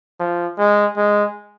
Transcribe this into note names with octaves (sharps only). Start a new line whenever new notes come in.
F3
G#3
G#3